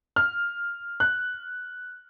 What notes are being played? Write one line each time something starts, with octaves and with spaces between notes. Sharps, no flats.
F6
F#6